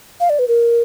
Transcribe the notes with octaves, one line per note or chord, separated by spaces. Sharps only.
F5
D5
B4
A#4